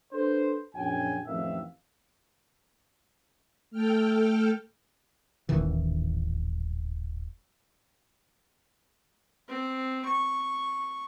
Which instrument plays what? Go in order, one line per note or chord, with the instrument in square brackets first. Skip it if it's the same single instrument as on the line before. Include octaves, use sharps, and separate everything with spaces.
[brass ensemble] D4 A4 B4 C5
A#1 F#2 F#3 G5 G#5
A1 F2 D#3 F3 E5 F5
[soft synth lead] A3 [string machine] A4 G5 F6
[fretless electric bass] D#1 A1 D#3 E3
[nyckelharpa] C4
C#6